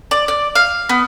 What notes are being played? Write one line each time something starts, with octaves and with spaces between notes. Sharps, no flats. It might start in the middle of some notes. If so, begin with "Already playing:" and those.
D5
D5
F5
B3